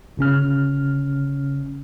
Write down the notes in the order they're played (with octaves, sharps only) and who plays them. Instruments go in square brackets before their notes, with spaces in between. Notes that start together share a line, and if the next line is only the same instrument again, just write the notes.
[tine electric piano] G1 C#3 C#4 F6